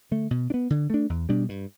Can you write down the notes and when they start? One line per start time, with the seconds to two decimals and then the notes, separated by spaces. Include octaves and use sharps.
0.11 D3 A3
0.31 B2
0.50 D4
0.54 B3
0.70 D3
0.90 A3 D4
1.10 E2
1.29 B2 G3 D4
1.49 G2